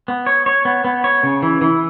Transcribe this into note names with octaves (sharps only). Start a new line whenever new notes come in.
B3
C#5
C#5
B3
B3
C#5
C#3
E3
E3